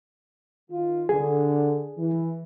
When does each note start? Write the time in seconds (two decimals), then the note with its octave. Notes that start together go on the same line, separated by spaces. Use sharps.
0.70 D#3 F4
1.09 D3 G#4
1.97 E3